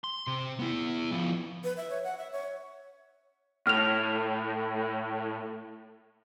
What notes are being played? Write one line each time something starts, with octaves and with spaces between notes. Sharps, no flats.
C6
C3
B3 E4
F3 B3
B4
E5
C#5
F#5
E5
C#5
A2 F6 F7